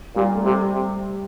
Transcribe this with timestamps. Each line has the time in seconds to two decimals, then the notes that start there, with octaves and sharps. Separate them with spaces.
0.16 A#2 G3
0.35 A3
0.45 C3 G3
0.74 C3